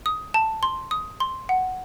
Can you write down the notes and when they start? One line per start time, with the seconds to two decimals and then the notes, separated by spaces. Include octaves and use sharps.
0.06 D#6
0.34 A5
0.63 C6
0.91 D#6
1.20 C6
1.49 F#5